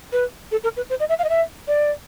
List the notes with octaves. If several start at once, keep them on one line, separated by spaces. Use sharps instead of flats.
B4
A4
A#4
B4
C5
D#5
E5
F5
D#5
E5
D5